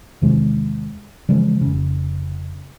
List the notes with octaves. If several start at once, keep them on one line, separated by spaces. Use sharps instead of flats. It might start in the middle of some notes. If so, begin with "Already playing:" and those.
E2 C3 D#3 G#3
C#3 E3 F3 G#3
F1 C#3